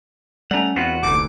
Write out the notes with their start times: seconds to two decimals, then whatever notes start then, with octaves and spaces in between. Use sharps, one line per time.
0.51 G3 A3 C#4 F#5 A#5
0.76 E2 B3 C4 F4 F#4 F#5
1.03 F1 D2 A#2 E3 A3 D6